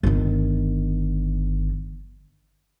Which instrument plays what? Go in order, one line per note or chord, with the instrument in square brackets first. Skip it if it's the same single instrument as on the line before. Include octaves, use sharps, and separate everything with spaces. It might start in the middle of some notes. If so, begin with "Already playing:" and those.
[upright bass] G1 D#3